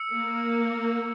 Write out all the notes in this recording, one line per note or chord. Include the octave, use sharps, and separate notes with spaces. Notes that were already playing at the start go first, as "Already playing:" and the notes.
Already playing: E6 C#7
A#3